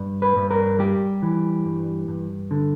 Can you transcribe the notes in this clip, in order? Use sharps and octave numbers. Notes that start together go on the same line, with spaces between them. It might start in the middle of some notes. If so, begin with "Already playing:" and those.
Already playing: G2
B4
G2
A#4
G3 G4
E3
G2
G2
D3